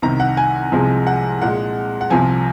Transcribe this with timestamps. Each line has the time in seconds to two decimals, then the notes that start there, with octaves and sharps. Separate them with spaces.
0.02 C2 C3 D#3 A#5
0.20 F#5
0.37 G#5
0.72 C2 C3 F3 G#3
1.07 F#5
1.42 A#2 G#3 F#5
2.01 F#5
2.10 C2 C3 F3 G#5